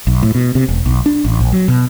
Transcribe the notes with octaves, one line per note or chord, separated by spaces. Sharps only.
B1
A2
B2
C3
E1
B1
D4
A1
A#1
F#3
B2